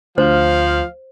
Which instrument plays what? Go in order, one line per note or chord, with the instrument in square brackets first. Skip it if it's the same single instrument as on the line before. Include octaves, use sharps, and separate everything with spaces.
[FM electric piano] D2 [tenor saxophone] F3 [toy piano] C5 [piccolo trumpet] F5